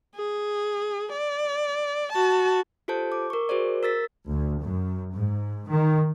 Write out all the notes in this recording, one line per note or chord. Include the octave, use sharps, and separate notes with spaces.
G#4
D5
F#4 A5
F4 G4 A4 C5 A5 G6
D6
A#4 C#6
F#4 G#4 A#4 C5 D5
A#4 E6 A6 B6
D2
F#2
G#2
D#3